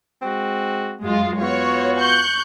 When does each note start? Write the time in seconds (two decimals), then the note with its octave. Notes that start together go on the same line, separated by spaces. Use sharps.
0.22 G#3 C4 F#4
1.03 F#2 G#3 F4
1.40 B3 F4 F#4 C#5
1.99 C#6 F#6 G6